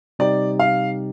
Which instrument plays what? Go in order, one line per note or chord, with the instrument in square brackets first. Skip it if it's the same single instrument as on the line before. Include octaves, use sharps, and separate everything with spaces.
[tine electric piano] C3 G3 C4 D#4 G4 [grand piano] D5
[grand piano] F5